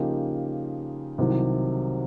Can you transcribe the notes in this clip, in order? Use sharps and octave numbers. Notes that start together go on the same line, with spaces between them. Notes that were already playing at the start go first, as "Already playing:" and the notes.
Already playing: C#3 F3 A#3 D#4 G4
C2 C3 D#3 F#3